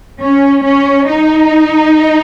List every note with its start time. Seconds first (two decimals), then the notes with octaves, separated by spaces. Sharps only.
0.21 C#4
0.64 C#4
1.07 D#4